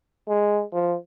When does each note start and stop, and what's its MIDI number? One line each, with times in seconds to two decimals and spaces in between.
0.28 0.63 56
0.73 0.96 53